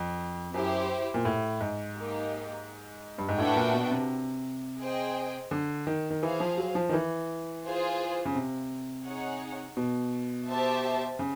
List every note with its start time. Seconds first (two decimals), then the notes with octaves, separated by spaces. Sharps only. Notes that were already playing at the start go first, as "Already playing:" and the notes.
Already playing: F2
0.54 F#2 E4 G4 C5
1.14 A#2
1.25 A2
1.61 G#2
1.96 A#3 D#4 G4
3.18 G2
3.29 G#2
3.38 A2 D4 F#4 B4 E5 G5
3.56 A#2
3.73 B2
3.92 C3
4.80 G#4 C5 D#5 G5
5.51 D3
5.87 D#3
6.10 D#3
6.22 E3 G#4 C5 F5
6.40 F3
6.58 F#3
6.75 F3
6.89 D#3
6.93 E3
7.64 F4 G#4 C5
8.25 C#3
8.35 C3
9.06 D#4 G#4 C#5 F#5
9.77 B2
10.47 G4 C5 E5 A5
11.19 C#3